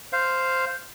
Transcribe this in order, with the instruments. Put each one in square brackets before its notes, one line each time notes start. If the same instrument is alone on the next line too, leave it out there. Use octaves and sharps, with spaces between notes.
[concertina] C5 F5